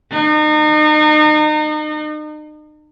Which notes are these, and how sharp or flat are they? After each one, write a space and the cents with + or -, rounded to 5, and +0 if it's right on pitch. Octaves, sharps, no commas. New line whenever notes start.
D#4 -35